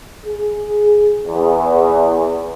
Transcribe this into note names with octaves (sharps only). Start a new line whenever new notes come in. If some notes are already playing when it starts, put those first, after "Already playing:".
G#4
E2